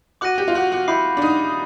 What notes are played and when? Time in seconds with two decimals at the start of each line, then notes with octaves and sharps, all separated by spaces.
0.21 F#4 D6 F#6 A#6 D#7
0.38 G4
0.48 F4
0.55 F#4
0.72 F#4
0.88 E4 B5 D6 G6 C7
1.17 D4
1.22 D#4